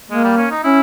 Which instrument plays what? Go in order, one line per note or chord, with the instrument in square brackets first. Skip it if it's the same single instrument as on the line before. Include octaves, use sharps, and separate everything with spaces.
[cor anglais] G#3 [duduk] A#3
[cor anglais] G3
C#4
D#4
[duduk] C#4 [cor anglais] E4